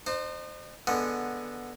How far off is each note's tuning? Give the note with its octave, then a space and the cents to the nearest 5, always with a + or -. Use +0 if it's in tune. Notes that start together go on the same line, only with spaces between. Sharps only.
D#4 -40 C5 +0
D3 +0 G#3 +0 B3 -10